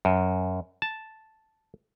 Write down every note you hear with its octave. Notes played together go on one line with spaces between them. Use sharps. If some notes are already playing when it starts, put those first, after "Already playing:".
F#2
A5